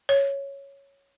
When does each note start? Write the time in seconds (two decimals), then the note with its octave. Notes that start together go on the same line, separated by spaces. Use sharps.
0.09 C#5